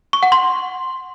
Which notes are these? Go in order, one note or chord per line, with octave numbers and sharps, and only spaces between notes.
C#6
F#5
C6